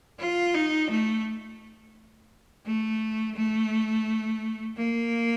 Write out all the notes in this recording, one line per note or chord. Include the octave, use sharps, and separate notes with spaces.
F4
D#4
A3
A3
A3
A#3